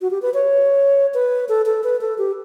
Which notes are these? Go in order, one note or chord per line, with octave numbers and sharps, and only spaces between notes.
F#4
G4
B4
C#5
B4
A4
A4
B4
A4
G4